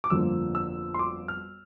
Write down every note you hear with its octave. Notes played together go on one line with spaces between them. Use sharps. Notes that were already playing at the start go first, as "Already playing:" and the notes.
D6
G1 F2 D3 F3 A#3 E6
E6
C6
D6
F6